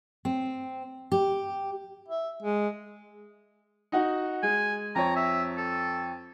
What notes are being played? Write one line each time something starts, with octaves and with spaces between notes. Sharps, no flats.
C4
G4
E5
G#3
D#4 F#4 F#5
G#3 G#5
F2 C#5 A#5
E5
A4